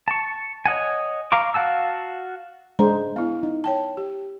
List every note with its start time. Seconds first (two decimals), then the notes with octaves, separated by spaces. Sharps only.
0.08 A5 C#6
0.66 C#5 D#5 F#5 G#5
1.32 F5 A#5 C#6 D6
1.54 F#4 F5 F#5 A5 E6
2.79 G#3 D4 C5 A#5
3.16 B3 E4 F5
3.43 D#4
3.64 C#5 G5 A5
3.97 G4